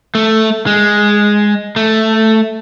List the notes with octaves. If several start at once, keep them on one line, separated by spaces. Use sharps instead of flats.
A3
G#3
A3